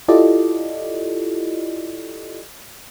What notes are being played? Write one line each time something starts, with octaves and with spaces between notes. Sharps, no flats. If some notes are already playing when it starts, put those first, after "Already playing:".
E4 F4 G4 A4 D5 D#5